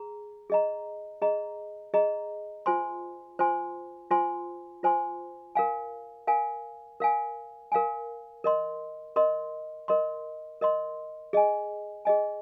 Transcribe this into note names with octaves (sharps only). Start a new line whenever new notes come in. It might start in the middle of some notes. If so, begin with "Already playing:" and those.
Already playing: G#4 A#5
G#4 D#5 A#5
G#4 D#5 A#5
G#4 D#5 A#5
F4 C5 G#5 C6
F4 C5 G#5 C6
F4 C5 G#5 C6
F4 C5 G#5 C6
A#4 F5 G#5
A#4 F5 G#5
A#4 F5 G#5
A#4 F5 G#5
A#4 D#5 C6
A#4 D#5 C6
A#4 D#5 C6
A#4 D#5 C6
G#4 D#5 G#5
G#4 D#5 G#5